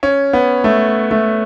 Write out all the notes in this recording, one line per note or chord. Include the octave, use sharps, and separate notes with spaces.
C#4
B3
A3
A3